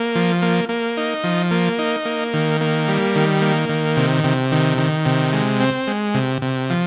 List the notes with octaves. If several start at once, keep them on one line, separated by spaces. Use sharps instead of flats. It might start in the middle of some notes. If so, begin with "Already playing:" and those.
Already playing: A#3
F3
A#3
A#3
D#4
F3
A#3
D#4
A#3
D#3
A#3
G3
D#3
A#3
D#3
C3
C3
D#3
D#3
C3
G#3
C4
G#3
C3
C3
F3